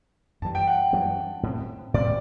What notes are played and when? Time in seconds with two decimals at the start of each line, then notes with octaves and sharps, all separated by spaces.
0.42 F#2 E3 G3 A5
0.55 G5
0.67 F#5
0.93 F#2 E3 G3
1.43 A2 G3 C4
1.94 A2 G3 C4 D5